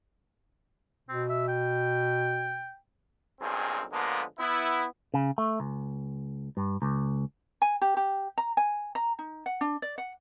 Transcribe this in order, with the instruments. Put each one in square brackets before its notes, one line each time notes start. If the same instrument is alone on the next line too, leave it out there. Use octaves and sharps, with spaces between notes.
[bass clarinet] B2 [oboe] C4
[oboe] E5
G5
[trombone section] B1 G2 A#2 C4 G#4
D3 F3 G#3 A#3 B3
B3 E4
[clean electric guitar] C#3
A3
C#2
G2
C#2
[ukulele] G#5
G4
G4
A#5
G#5
A#5
D#4
F#5
D4
D5
F#5